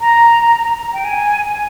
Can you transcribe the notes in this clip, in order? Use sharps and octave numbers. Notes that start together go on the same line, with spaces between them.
A#5
G5
G#5